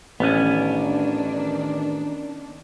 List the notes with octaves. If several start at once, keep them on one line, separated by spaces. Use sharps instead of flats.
A1 D#3 B3 C#4 D4